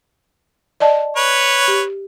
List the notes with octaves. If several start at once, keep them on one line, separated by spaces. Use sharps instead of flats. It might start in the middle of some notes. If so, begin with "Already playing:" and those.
D5 D#5 A5
B4 C#5
G4